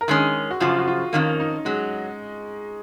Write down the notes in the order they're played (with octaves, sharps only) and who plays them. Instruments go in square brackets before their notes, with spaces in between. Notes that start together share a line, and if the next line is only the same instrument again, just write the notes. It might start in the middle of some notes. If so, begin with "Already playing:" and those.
[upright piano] A#4
[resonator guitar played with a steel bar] D#3 G#3 C#4 [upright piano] G#4
[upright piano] F#4
[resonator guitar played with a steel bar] F#2 C#3 F3 [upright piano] F4
[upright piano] F#4
F4
[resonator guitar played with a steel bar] F2 D#3 A#3 [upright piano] C#4
[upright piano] D#4
[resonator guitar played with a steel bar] F#3 [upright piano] G#3